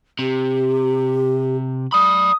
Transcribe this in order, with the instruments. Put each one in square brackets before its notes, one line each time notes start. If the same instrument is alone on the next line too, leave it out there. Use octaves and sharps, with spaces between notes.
[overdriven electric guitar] C3 [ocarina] G4
[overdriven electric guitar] D5 B5 [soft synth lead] D#6